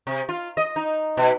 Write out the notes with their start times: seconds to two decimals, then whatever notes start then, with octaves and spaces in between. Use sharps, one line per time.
0.07 C3
0.29 F4
0.57 D#5
0.76 D#4
1.17 B2